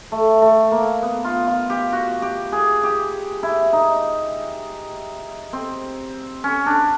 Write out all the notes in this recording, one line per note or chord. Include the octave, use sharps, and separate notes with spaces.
A3
A3
A#3
B3
F4
F4
G4
F#4
G4
G#4
G4
E4
D#4
C4
C#4
D4